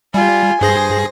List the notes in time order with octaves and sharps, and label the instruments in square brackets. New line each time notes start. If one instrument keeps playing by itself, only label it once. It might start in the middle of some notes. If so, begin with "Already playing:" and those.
[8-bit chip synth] G3 [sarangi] F4 [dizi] G#5
[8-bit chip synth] G2 G#4 A#6 [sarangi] C5